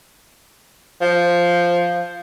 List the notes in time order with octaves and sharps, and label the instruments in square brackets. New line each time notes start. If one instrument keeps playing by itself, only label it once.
[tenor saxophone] F3